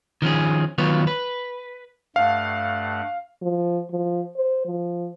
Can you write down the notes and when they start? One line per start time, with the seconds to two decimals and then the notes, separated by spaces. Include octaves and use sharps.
0.22 D#3 F3 C#4 G#4
0.78 D#3 F#3 B3 F4 B4 C#5
1.07 B4
2.16 G2 A3 F5 F#5
3.42 F3
3.91 F3
4.36 C5
4.66 F3